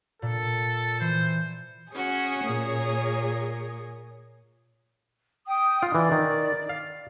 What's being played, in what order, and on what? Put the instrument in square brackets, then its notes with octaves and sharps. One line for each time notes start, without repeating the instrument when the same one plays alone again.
[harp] A#2 [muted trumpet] A4
[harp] E3 [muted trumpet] C5
[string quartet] C#4 F#4 [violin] G#4 C#5
[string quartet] A#2
[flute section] G5 D#6
[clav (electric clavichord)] F4
[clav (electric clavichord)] E3 [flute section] D5
[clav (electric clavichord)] D#3
F5